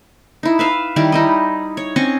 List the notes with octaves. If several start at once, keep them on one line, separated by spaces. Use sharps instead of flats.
D#4 E4
B4 E5 F5
D#3 G3 E4 G4
D#4 E4 D#5
C#5
C4 C#4 D#5 C#6